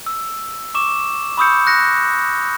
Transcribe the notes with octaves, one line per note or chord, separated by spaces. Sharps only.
E6
C#6 D6 E7
B5 C#6 D#6 E6 G6 C#7
F#6 A#6 C#7